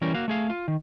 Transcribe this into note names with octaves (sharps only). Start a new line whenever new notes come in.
E3 G3 C#4 A#4
A#3 F#4 F5
A3 G#4 F5
F4
D#3